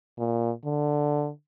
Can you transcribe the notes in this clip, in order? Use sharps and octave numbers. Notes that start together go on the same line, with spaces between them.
A#2
D3